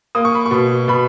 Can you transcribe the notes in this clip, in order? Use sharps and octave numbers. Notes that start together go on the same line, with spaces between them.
A#3 D#6
C#6
B5
C#6
B2
B2 B5